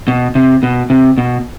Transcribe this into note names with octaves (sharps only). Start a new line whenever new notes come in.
B2
C3
B2
C3
B2